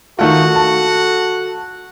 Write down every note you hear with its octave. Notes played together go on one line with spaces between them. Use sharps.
D#3 A3 F4 F#4 A4 F#5
A5